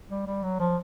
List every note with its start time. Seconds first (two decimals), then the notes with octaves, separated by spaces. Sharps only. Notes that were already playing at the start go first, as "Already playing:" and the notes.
0.10 G3
0.26 G3
0.43 F#3
0.60 F3